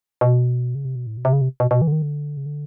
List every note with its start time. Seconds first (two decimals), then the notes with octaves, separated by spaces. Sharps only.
0.21 B2
0.75 C#3
0.85 C3
0.96 B2
1.07 A2
1.17 B2
1.25 C3
1.33 C#3
1.41 C3
1.60 B2
1.71 B2
1.82 E3
1.87 D3
1.92 D#3
2.02 D3
2.37 C#3
2.46 D3